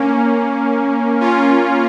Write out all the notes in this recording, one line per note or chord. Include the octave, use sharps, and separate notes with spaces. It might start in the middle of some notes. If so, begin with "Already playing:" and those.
Already playing: A#3 C#4
C#4 F4